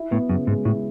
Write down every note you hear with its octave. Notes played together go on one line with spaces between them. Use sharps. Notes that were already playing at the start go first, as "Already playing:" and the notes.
Already playing: E4
A2 B3
F#2 C#3
G#2 G#3
A2 E4